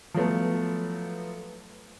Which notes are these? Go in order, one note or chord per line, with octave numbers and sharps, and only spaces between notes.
F3 F#3 A3 B3